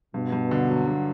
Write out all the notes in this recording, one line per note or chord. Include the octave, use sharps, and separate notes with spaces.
G2 B2
G2
D3
F#3
G2